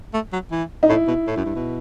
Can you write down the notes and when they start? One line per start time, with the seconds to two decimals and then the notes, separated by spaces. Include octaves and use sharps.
0.14 A3
0.33 F#3
0.52 E3
0.83 D#4
0.89 A2 E4
1.08 B2
1.27 A2
1.37 F#2
1.45 G2
1.56 B2